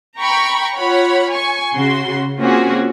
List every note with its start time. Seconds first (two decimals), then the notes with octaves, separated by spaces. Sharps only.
0.19 G5 A#5 B5 C#6
0.75 F4 C#5 F#5 B5
1.31 G#5 C#6
1.73 C#3 F#4 C6
2.38 A#3 C4 C#4 F4 F#4 G#4